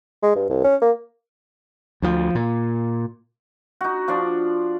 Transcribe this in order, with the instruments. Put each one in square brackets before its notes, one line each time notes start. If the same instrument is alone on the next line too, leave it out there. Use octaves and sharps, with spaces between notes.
[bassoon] G#3
G2
C2
C#4
A#3
[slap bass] D2 F3
A#2
[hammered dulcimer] D#4 F#4
F3 D4 D5